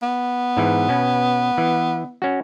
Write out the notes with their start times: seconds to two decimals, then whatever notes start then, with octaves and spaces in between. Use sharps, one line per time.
0.03 B3
0.57 G#2 E3
0.89 B2 C#4
1.58 E3
2.22 C#4 F#4